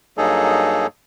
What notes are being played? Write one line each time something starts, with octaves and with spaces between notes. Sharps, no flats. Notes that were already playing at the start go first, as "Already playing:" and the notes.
G2 F#3 A#3 D#4 G#4 A4